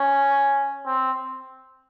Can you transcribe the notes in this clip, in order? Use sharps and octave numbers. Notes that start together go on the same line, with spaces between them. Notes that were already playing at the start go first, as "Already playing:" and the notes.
Already playing: C#4
C4